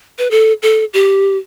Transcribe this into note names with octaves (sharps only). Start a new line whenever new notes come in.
B4
A4
A4
G4